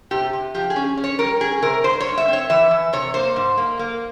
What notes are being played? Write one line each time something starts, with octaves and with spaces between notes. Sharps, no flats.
C3 G4
C3
F3 G4
G#4
C#4
C#4
C#5
G3 A#4
C#4 G#4
C3 A#4
G2 C5
C#5
G2
E5
C4 C#5
E3 E5
E3
C3 C#5
A#3 C5
G#2
A#3
A#3